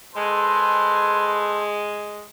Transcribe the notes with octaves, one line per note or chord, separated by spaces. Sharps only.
G#3 A4 B4 C5